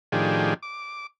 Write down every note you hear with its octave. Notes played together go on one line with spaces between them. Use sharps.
A2 D#3 F3 D4 G4 G#4
D6